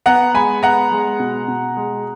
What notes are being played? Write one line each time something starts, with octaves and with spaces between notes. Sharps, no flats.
B3 F#5 A#5
G#3 G#5 B5
B3 F#5 A#5
G#3
B2
B2
G#3